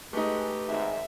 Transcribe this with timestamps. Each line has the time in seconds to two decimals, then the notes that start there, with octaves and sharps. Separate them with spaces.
0.13 G#3 A3 D#4 G4 B4
0.68 G#1 G#2 E5